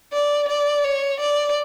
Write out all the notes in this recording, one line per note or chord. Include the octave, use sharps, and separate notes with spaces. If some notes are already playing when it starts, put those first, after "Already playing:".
D5
D5
C#5
D5